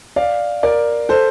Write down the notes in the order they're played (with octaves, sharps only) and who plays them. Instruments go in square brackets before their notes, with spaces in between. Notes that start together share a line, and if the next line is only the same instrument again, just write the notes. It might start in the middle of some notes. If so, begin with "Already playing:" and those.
[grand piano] D5 F5
A#4 D5
A4 C5